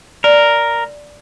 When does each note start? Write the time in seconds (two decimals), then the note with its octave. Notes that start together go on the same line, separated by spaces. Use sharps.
0.24 A#4 D5